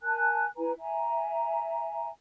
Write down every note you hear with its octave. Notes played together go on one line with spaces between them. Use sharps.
A#4 G#5 A5 F#6
E4 B4 G#5 A#5
E5 G#5 A#5